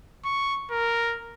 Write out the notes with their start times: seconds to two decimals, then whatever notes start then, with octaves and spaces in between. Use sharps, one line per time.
0.25 C#6
0.71 A#4